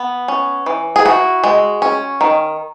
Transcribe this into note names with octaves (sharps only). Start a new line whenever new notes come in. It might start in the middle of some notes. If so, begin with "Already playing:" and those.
Already playing: B3
C#4
E3
G#4
E4 F#4
G#3
C#4
D#3